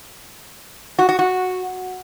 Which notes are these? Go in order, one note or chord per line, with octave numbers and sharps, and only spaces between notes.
F#4
F#4
F#4